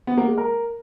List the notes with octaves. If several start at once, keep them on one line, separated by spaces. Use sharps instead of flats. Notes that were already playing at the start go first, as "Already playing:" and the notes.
B3
A#3
G#3
A#4